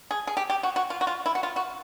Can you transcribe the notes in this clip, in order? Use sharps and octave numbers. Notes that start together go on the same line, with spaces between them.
G#4
G#4
G4
G4
F#4
F#4
F4
F#4
F4
E4
F#4
F4
F#4